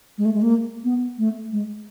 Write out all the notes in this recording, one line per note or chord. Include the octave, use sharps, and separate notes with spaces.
G#3
A3
G#3
A#3
B3
A3
G#3